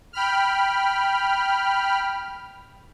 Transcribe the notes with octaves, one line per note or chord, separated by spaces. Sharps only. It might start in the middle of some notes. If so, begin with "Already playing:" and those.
G5 B5 F6